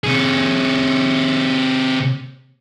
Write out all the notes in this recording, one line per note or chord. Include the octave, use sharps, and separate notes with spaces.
C3 G#4